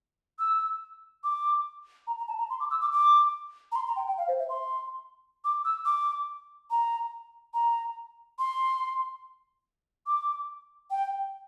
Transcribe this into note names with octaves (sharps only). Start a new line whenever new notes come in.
E6
D6
A#5
A#5
A5
A#5
C6
D6
E6
D6
D6
A#5
C6
A#5
G5
G5
F5
C5
E5
C6
D6
E6
D6
A#5
A#5
C6
D6
G5